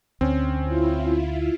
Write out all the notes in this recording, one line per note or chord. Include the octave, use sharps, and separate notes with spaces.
D2 C4 C#4
E4 F4